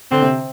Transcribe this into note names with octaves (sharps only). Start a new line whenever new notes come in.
D3 C4
C3